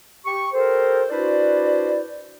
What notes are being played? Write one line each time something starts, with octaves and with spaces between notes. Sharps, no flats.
G4 C#6
G4 A4 A#4 C5
D4 E4 F#4 B4 C5 D5